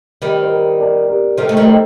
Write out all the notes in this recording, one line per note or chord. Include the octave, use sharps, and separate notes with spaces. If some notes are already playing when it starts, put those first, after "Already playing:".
D#3 G3 C5 D#5
C5
A#4 D5
A#4 D5
G4 A#4
D#3 G3 A4 C5
A3
D#3 G3
A4 C5